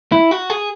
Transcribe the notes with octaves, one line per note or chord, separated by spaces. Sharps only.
E4
F#4
G#4